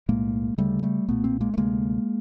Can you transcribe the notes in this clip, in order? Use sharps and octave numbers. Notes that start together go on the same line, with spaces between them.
B1 A2 G#3 A#3
D2 C#3 G3 A3
G3 A3
B1 A#2 A3 B3
A#3 C4
G#3 A#3
A3
D2 C3 G#3 A#3